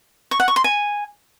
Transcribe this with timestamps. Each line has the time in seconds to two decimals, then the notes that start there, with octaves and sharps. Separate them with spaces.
0.31 C#6
0.40 F#5
0.48 C#6
0.56 C6
0.64 G#5